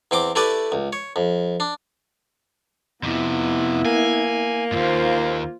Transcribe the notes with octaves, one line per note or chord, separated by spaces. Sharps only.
E2 C4 G5 D6
A3 E4 G4 B4 D5
C#2
C#5
F2
D4
F2 C3 B3 E4
A#3 G#5
D#2 G#2 F4 C5